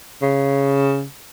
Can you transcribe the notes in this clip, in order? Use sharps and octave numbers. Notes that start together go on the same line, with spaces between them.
C#3